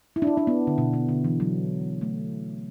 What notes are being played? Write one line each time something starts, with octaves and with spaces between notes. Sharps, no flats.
E4
D4
E4
D4
B3
D3
B2
B2
D3
E3
F#3
A3